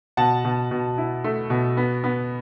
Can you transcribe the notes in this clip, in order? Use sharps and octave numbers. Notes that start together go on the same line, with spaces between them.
B2 F#5 A5
B2
B2
E4
A3
B2
B3
B3